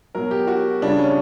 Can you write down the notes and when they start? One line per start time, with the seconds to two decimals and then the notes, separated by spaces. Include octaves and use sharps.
0.15 B2 F#3 A#4
0.31 G4
0.48 F#4
0.82 C#3 G3 D4
0.99 C#4